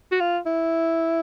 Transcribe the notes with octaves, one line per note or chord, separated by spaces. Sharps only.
F#4
F4
E4